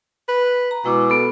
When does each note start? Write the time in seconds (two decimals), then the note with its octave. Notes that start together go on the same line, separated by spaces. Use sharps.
0.28 B4
0.71 A#5
0.85 B2 G#3 E4 D6
1.10 B3 A4